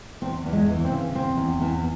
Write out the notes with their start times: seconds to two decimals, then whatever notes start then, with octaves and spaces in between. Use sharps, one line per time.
0.22 E2 C4
0.46 E2
0.53 G#3
0.69 E3
0.84 C4
0.91 C#3
1.15 E2 C4
1.37 E2
1.61 E2